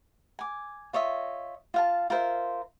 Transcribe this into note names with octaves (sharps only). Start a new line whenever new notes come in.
G#5 D6
F4 C#5 D#5 E5
F4 F5 A5
F4 A#4 C5 E5